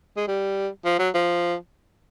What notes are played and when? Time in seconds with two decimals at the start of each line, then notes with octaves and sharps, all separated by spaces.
0.17 G#3
0.28 G3
0.85 F3
0.99 F#3
1.14 F3